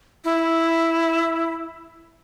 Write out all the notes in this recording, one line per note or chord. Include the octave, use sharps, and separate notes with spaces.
E4